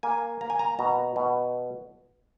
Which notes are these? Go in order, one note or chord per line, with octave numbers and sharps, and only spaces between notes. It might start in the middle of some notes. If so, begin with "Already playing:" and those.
A#3 G#5
A#3 A#5
G#5
A#5
B2 A#5
B2